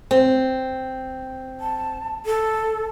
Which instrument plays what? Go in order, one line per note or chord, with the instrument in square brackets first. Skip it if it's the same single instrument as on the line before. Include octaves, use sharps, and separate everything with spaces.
[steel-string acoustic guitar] C4
[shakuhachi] A5
A4